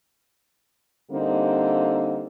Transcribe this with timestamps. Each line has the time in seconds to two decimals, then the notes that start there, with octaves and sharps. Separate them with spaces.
1.11 D3 G3 A#3 C4 D#4